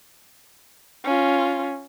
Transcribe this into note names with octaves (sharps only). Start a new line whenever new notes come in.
C#4 F4